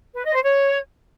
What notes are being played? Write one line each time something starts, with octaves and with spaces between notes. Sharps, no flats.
B4
D#5
C5
C#5